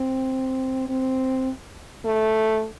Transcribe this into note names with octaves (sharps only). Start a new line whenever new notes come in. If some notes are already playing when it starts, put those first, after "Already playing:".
Already playing: C4
C4
A3